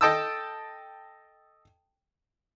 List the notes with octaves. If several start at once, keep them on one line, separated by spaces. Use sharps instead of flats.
A4 D#5 G5 A5 D#6 E6